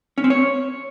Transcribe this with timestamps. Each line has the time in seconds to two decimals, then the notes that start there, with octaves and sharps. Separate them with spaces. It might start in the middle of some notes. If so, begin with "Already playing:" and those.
0.18 C#4
0.24 C4
0.30 C#5